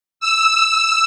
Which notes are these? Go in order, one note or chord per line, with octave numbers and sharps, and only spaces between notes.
E6